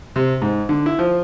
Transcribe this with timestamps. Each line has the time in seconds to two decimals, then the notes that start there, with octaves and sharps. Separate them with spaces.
0.16 C3
0.42 G#2
0.69 D3
0.86 E4
0.99 F3